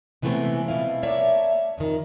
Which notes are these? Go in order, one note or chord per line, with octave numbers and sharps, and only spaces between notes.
C3 E3 G#3 A3 B3 C4
B2 F3 A3 E4 F5
A#3 C#5 D5 E5 A5
F2 D#3